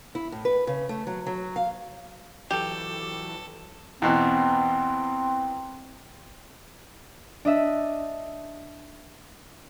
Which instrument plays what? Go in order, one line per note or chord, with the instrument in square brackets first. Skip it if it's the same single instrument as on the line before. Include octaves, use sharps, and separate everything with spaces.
[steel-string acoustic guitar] E4
A2
B4
C#3
A3
F#3
F#3
F5
[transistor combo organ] E3 F#3 [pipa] G4 [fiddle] A4
[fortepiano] E2 B2 E3 [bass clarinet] C4
[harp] D4 D#5 E5